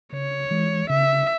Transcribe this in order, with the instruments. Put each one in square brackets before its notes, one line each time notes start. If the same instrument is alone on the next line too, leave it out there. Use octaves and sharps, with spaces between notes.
[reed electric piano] C#3 [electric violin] C#5
[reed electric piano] E3 G#3
[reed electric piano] C#3 [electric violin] E5